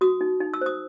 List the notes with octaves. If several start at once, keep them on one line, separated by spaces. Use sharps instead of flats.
F#4 D#6
D#4
D#4
E6
C5 D#6